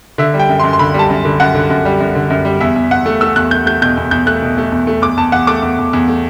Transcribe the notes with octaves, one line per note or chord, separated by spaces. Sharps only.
D3 E5
G3
G5
F#2
C6
F#2
C6
D3 B5
G3 A5
F#2
D3
F#2 F#5
D3
F#2
G3
F#2
D3
F#2
G3
E2 E5
E2
E2 F#5
A3
A3 E6
E2 F#6
A3 G6
A3 G6
B2 G6
E2
E2 G6
A3 F#6
B2
A3
E2
A3
E2 D6
E2 A5
E2 F#5
A3 D6
E2
E2
E2
A3